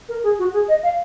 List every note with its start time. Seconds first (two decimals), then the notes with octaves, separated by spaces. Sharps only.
0.09 A#4
0.23 G#4
0.39 F#4
0.53 G#4
0.68 D#5
0.83 F5